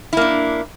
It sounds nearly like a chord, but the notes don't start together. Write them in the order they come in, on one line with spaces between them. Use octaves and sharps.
E4 A#3 D4